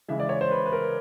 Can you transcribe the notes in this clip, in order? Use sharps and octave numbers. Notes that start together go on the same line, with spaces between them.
C#3 E3 G#3 E5
D5
C#5
C5
B4
B4
A#4